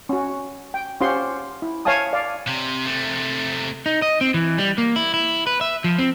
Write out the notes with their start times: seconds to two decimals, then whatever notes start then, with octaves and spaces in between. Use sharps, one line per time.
0.09 C#4 F#4
0.74 G5
1.01 C#4 F4 G4 C5 F#5 C6
1.62 E4
1.85 C#5 E5 F5 G#5 A5 D#6
2.13 D5 F5
2.47 C3
2.86 C3 A3
3.86 D#4
4.02 D#5
4.21 C4
4.34 E3
4.58 G3
4.78 A#3
4.96 E4
5.14 E4
5.47 B4
5.61 E5
5.84 F3
5.99 C4